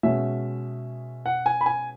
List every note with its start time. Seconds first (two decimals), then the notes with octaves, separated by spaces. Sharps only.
0.03 B2 G#3 C#4 E5
1.26 F#5
1.46 G#5
1.61 B5
1.66 G#5